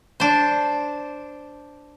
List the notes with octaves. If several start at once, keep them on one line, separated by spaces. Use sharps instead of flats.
D4 C5